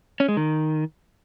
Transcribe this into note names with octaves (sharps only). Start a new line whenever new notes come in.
C#4
G#3
D#3